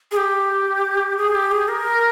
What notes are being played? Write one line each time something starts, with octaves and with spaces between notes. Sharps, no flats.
G#4
G4
G#4
G4
G#4
A#4